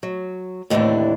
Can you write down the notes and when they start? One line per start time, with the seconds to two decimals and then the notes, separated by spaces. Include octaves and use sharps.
0.03 F#3
0.70 D#2 A2 C3 D#3 E3 D4